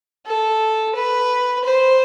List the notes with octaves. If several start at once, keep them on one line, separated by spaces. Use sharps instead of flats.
A4
B4
C5